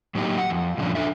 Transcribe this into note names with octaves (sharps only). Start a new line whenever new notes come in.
A2 F#3 A#3 D#4 G4
F#5
F2
G2 A#2 D3 F3 C#4 D4
D4 A4 E5